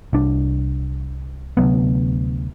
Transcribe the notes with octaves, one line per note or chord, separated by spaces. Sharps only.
C2 D4
D2 C3 F#3 B3